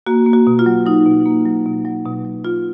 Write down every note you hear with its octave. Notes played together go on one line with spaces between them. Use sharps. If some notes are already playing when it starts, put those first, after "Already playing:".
A#3 F#4
A#3
F#4
B2
F4
F#3
F#3 D#4
B2
A#3
F#3
B2
F#3
B2
F#3
B2 F4